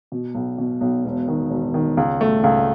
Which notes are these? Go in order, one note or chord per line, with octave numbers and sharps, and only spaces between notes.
B2
B1
B2
B1
E1
D#3
E1
D#3
C#2
A3
C#2